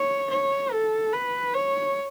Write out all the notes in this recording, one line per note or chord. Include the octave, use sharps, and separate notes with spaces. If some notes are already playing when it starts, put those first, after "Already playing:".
Already playing: C#5
C#5
A4
B4
C#5